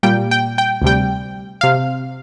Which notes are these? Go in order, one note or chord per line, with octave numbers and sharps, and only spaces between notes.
A#2 G3 A#3 G5
G5
G5
D2 C3 G3 G5
C3 F5